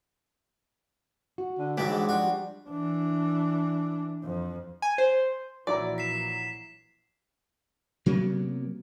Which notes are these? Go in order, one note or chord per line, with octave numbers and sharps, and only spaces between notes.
F#4
D3
G#2 E3 F#3 D4 G4
G#3
F3 F#4 D5
G3
E3 D4
F2
G#5
C5
A#1 E3 F#3 E4 D5 A#5
B6 C7 E7
C3 F#3 A#3 B3